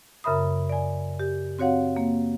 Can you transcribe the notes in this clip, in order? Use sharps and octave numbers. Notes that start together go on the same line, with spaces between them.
F#2 C#3 A#4 E5 B5 D#6
D5 G#5
G4
C4 F#4 C#5 F5 F#5
A#3